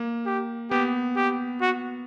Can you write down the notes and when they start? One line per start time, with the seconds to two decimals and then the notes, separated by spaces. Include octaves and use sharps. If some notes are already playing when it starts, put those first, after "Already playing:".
Already playing: A#3
0.26 G4
0.71 B3 G4
1.16 G4
1.61 F#4